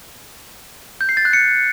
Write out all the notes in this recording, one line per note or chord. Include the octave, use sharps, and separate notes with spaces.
G6
C7
A6
F#6
C#7